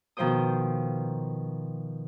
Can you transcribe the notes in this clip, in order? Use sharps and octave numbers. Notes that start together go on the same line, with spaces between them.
B2 D#3 F3 C5 G5 D#6